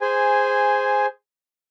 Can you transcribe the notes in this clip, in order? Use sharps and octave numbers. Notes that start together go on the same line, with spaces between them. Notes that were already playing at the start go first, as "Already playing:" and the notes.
G#4 C5 G#5